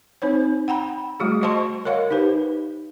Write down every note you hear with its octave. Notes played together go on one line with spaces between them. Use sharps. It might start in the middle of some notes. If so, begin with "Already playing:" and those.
C4 D#4 C5 C#5
F#5 G5 A#5 B5
G3 A3 F#4 G#4
F#4 C5 D#5 A5 C6 C#6
A#4 C#5 D#5 F5 F#5
D#4 G4 B4 C5